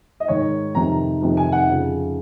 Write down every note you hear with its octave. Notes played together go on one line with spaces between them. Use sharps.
D#5
G#2 D#3 C#5
F2 C3 D#3 A#5
F2 C3 D#3
G#5
F#5
F2 C#3 F3